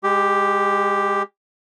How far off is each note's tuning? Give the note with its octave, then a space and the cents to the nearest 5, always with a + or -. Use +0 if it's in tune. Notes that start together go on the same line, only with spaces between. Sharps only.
G#3 -30 G4 +0